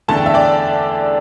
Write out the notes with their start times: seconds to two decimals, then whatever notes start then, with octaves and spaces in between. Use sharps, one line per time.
0.08 E2 D3 A3 A5
0.17 G5
0.26 E5
0.34 D5 G5